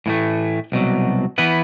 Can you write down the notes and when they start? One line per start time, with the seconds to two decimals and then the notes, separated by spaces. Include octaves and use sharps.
0.06 A2 E3 A3
0.72 C2 B2 F#3
1.38 E3 B3 E4 B4